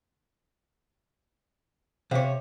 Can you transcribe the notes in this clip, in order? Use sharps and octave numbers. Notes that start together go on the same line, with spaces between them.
C3 C5 C#5 F5